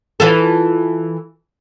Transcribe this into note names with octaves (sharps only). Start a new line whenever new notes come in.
E3 F4 A4